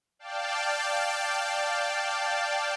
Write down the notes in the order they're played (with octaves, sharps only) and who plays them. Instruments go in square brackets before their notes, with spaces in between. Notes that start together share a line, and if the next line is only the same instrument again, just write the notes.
[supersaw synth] D5 F5 G5 A5